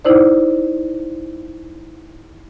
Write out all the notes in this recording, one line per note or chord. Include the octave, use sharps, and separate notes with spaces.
D#4 E4 C5 D5